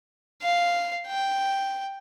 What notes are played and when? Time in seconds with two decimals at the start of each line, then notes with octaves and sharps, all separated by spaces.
0.43 F5
1.07 G5